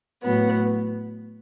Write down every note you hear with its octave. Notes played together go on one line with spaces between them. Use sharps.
A2 F#3 B3